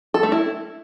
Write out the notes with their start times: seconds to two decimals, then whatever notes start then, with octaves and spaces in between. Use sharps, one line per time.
0.14 A4
0.23 A3
0.32 E4